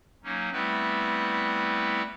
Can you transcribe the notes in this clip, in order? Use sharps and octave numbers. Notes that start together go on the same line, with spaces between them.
F#3 A#3 C#4 D#4
G3 A3 B3 C4 E4 B4